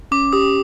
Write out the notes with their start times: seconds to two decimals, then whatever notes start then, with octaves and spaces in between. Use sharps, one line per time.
0.11 C#4 D6
0.33 G4 D#6